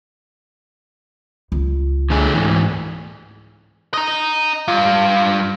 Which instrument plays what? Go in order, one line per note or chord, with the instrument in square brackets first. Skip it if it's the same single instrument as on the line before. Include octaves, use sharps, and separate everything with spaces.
[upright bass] C#2
[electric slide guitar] D3 A3 G#4
G#2 E3
[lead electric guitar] D#5 A#5
[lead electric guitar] G2 [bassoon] F4